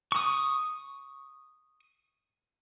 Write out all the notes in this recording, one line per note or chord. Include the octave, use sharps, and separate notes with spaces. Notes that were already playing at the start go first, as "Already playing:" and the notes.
C#6 D#6